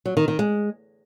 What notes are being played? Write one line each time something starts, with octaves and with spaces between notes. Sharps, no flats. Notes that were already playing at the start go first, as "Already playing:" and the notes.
F#3
D#3
D#3
G#3